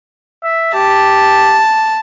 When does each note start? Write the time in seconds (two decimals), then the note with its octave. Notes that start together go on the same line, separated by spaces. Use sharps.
0.44 E5
0.74 G4 A5